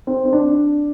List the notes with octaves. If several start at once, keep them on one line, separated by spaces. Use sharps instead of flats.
C4
C4
D4